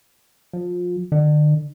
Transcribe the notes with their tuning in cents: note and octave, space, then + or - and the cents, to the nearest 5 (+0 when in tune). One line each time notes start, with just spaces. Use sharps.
F3 +25
D3 +35